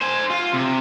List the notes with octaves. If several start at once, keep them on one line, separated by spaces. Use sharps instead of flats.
C5 G#5
F4
C3